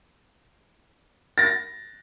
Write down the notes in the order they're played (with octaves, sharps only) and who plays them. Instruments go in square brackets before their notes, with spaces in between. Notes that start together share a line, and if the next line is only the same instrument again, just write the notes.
[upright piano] A6 A#6